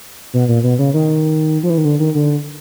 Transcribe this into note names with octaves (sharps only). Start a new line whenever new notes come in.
B2
A#2
B2
C#3
D#3
F3
E3
D#3
D3
D#3
D3